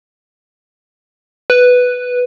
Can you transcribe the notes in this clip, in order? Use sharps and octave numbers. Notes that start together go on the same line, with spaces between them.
B4